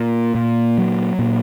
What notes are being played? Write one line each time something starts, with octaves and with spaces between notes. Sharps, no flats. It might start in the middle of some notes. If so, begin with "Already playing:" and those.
Already playing: A#2
A#2
F#3
A#2